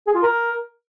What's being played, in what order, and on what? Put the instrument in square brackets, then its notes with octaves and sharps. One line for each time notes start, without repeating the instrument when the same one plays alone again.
[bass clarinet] G#4
F4
A#4